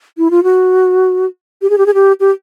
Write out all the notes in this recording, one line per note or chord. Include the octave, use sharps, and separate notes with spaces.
E4
F4
F#4
G4
G#4
G4
G#4
G4
G4